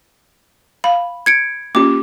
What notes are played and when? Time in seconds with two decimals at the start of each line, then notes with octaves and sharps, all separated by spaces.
0.84 F5 B5
1.26 G#6 C#7 D7
1.75 A#3 C#4 F4 G4 D6